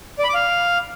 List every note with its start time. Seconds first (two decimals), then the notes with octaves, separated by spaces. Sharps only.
0.19 D5
0.24 B5
0.29 D6
0.34 F5